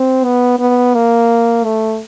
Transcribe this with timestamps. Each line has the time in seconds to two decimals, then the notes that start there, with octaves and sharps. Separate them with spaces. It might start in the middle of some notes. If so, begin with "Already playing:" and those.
Already playing: C4
0.25 B3
0.59 B3
0.94 A#3
1.64 A3